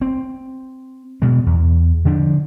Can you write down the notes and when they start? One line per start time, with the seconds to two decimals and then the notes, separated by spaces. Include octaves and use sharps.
0.01 C4
1.22 B2 G#3
1.46 E2
2.05 D3 F3 D4